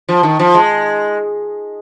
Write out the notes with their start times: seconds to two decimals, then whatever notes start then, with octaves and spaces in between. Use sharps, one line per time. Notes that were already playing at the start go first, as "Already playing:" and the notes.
0.09 F3
0.23 D#3
0.39 F3
0.54 G#3